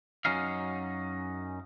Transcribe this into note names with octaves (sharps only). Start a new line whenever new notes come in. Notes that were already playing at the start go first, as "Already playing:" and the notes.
F#2 F#3 C#4 D#4 F5